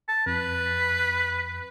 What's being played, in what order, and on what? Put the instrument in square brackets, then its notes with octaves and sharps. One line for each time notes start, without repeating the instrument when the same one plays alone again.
[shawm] A5
[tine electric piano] F2 [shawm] B4